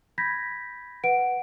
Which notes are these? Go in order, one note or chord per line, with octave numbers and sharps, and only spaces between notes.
B5 G6 G#6 A#6 B6
B4 F#5 D7